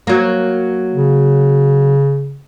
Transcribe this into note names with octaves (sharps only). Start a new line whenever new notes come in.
F#3 A#3
C#3